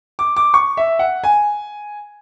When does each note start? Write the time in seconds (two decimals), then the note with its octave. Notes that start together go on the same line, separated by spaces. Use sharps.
0.19 D6
0.36 D6
0.54 C#6
0.77 E5
0.99 F#5
1.24 G#5